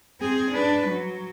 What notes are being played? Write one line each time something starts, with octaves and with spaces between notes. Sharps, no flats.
C4 G#4
D4 B4
F#3